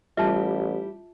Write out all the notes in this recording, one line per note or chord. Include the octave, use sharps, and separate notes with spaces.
A1 G3 E4 F4 E5 A5